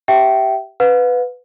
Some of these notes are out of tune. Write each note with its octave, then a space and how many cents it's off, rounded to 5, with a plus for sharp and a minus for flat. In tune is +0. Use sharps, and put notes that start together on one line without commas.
G4 -10 E5 +0 G5 -20
B4 +10 F5 +45